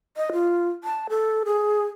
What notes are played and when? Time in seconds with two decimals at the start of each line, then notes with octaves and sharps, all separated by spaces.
0.17 D#5
0.32 F4
0.84 A5
1.10 A4
1.46 G#4